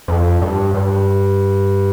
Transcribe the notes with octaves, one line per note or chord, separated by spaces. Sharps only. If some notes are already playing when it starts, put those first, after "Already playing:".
F2
G2
G2